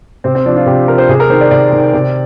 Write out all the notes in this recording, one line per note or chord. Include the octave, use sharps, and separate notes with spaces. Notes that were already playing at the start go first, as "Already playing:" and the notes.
C3 C4
C4
F3 D4
F4
C3 G4
F3 A#4
C5
C3 G#4
A#4
D#3 C5
D5
C3 D5
D#3
C3